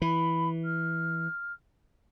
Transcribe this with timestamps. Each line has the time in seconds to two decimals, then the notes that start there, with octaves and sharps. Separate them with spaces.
0.02 E3 B5
0.65 F6